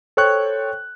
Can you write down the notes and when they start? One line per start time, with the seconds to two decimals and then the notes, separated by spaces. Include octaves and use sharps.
0.17 A4 C5 C#5 G5 C#6 F#6